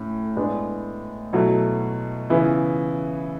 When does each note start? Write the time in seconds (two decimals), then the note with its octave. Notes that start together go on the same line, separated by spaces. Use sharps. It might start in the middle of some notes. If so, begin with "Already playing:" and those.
Already playing: A2 C#4
0.37 A2 G#3 B3 D4
1.33 B2 F#3 A3 E4
2.30 C#3 E3 B3 E4